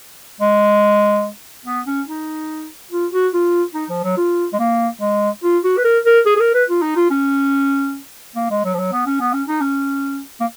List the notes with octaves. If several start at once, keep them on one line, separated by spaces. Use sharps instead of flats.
G#3
B3
C#4
D#4
F4
F#4
F4
D#4
F3
F#3
F4
G#3
A#3
G#3
F4
F#4
B4
A#4
A#4
G#4
G#4
A#4
B4
F4
D#4
F4
C#4
A#3
G#3
F#3
F3
F#3
B3
C#4
B3
C#4
D#4
C#4
A#3